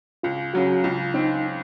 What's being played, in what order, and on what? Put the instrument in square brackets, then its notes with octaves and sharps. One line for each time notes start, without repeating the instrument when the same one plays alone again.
[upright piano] C#2 [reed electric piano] F4
[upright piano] C#3 F#3 [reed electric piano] F#4
[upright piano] C#2 [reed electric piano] F4
[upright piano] C4 [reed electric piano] D#4